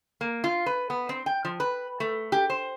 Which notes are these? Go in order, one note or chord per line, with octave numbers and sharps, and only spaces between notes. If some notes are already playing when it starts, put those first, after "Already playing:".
A#3
F4
B4
B3
C4
G5
F3
B4
A3
G4
C5